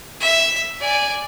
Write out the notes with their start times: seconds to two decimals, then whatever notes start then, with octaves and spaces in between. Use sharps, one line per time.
0.20 E5
0.80 D5 G#5